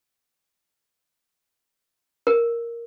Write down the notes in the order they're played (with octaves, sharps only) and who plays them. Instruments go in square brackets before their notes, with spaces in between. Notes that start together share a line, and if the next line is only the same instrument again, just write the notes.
[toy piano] A#4